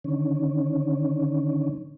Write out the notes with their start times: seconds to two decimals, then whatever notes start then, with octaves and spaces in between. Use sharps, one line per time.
0.04 D3 D#3 C#4